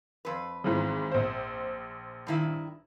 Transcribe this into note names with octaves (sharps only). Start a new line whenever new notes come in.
F2 B4
G#1 G#2 E3
A#1 C5
G2 D#3 E4